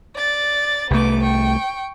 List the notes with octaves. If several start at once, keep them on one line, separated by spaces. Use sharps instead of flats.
D5 A6
C2 A3 B3 D6
G5 C#6